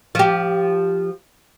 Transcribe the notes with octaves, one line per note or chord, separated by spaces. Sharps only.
F3 G4